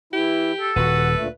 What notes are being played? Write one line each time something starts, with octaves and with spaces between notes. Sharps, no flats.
E3 E4 G4
A4
D#1 F#4 B4 F#5
D2 A#2 A3